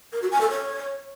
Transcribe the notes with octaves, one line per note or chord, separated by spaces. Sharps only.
A#4
F#4
G#5
A4
C#5